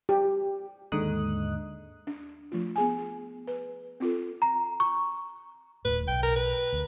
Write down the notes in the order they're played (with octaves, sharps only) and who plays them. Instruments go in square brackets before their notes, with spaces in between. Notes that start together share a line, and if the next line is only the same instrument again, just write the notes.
[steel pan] G4
[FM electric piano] D#2 G#2 D3 D#4 D#6 F#6
[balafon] D4
F3 A3 F4
B3 G#4 G#5
G#4
B4
C4 F4 A4
[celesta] A#5
C#6
[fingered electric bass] D#1 A2 [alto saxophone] B4
[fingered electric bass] B1 [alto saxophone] G5
[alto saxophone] A#4
B4
[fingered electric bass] D2